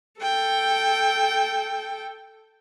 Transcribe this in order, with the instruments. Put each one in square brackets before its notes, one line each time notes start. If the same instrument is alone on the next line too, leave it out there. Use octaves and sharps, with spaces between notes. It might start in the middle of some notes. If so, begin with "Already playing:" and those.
[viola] A4 G5